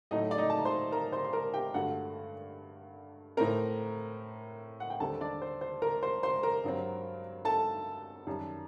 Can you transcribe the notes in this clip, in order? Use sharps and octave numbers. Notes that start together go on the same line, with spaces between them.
A2 F#3 A3 D#4 D#5
D5
D#4 D#5
A5
A#5
C5 C6
A#4 A#5
C5 C6
C6
A#4 A#5
G4 G5
G2 D3 A3 F#4 F#5
A2 A3 C4 A#4 A#5
F#5
G5
D#2 D3 G3 C4 A4 A5
D4 D5
C5
C5
A#4 A#5
C5 C6
C5 C6
A#4 A#5
G2 F#3 C4
A4 A5
F#2 D#3 G3